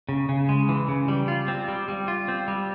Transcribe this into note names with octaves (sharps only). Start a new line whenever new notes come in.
C#3
C#3
G#3
E3
C#3
G3
F4
C4
G3
G3
F4
C4
G3